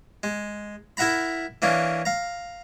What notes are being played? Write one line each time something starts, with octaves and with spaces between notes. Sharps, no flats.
G#3
E4 A#4 E5 F#5 A#5 B5
E3 A#3 C#4 D4
F5 A#5